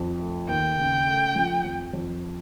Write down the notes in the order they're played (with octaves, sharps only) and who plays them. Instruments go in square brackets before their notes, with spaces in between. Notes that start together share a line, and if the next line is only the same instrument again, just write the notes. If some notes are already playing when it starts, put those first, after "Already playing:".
Already playing: [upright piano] F2
A3
[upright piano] D#2 [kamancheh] G5
[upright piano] C#3
A3
F3
F2
F2